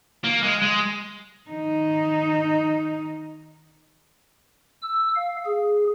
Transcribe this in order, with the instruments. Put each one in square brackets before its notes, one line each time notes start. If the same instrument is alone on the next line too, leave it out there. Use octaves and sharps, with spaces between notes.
[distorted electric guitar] A#3
G#3
G#3
[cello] D#3 D#4
[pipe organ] E6
F5
G#4